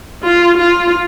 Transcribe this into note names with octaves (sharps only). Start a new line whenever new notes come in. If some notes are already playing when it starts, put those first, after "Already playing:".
F4
F4